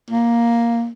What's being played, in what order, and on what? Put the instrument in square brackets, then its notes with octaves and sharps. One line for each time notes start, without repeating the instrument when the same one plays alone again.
[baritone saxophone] A#3